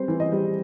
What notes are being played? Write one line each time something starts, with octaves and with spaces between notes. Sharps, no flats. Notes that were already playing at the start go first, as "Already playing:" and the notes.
Already playing: G3 C4 C5
E3
D#5
G3